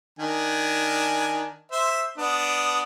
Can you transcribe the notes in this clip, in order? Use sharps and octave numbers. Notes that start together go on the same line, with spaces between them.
D#3 D4 G#5
C5 E5
B3 D4 D#6